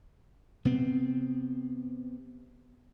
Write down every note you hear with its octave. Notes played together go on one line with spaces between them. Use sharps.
C3 B3 C4